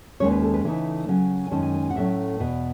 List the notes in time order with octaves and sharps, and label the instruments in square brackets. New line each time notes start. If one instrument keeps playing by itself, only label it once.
[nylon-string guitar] D#2 D#3 G#3 C#4 C#5
B4
A4
B4
C#3 E3 A3 D#4 B4
C#3 F#3 C#4
G#5
F#2 D#3 G#3 C#4 A5
G#5
G#5
G#5
F#5
A2 F#3 A3 C#4 E5
E2 B2